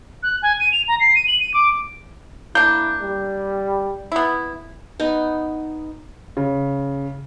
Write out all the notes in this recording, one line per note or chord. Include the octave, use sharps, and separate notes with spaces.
F#6
G#5
D#7
F7
A#5
C7
D#7
F#7
D#7
D6
A#3 D4 E4 G6
G3
B3 E4
B3 D#4
C#3